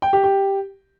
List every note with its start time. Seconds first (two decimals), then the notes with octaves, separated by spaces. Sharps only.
0.02 G5
0.13 G4
0.24 G4